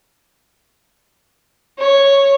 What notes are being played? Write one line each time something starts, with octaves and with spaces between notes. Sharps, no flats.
C#5